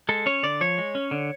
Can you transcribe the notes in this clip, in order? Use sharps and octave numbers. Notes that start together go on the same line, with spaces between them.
G#3 A4
C#4 C#5
D3 D5
F3 C#5
G#3
C#4
D3